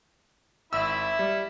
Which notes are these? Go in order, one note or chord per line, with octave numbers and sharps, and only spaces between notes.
G#1 E4 E5 B5 E6
G3